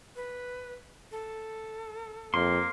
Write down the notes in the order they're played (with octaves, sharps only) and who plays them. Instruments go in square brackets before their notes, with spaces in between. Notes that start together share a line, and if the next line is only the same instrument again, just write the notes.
[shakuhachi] B4
A4
[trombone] F2 [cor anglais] A#3 [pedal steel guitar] C6